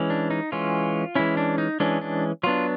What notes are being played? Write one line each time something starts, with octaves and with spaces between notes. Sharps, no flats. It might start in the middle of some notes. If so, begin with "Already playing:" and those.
Already playing: E3 G#3 C#4
D4
D#4
E3 G#3 C#4 F4
E3 G#3 C#4 E4
D4
D#4
E3 G#3 C#4 D4
D4
F#3 B3 D4 F4